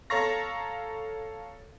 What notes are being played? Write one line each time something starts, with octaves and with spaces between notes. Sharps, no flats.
A4 C#5 F5 A#5 C#6 A#6